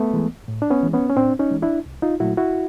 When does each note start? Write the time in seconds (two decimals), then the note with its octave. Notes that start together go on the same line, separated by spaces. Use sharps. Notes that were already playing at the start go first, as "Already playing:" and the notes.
Already playing: A3 B3
0.13 E3 G#3
0.48 A2
0.62 D4
0.71 B3 C#4
0.83 E3 G#3
0.93 B3 C#4
1.10 C#4
1.16 A2 C4 D4
1.39 C#4 D#4
1.51 E3 G#3
1.62 D4 E4
1.86 C2
2.02 D#4 F4
2.20 A#2 F#3 A3 E4 F#4
2.37 E4 F#4